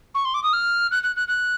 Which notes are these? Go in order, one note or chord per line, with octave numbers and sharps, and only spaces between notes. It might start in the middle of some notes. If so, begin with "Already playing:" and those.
C#6
C6
D6
D#6
F6
F#6
F#6
F#6
F#6